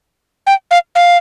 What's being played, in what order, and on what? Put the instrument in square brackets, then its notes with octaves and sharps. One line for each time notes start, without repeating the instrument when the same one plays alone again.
[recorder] G5
F5
F5